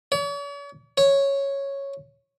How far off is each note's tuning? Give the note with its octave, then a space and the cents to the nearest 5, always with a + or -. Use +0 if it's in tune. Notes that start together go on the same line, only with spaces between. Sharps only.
C#5 +45
C#5 -5